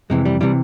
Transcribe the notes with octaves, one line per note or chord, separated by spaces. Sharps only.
F2 C3 E3 G#3
G3
C3 E3 G3